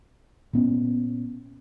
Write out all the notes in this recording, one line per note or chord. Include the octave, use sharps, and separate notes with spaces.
A#2 B3 C#4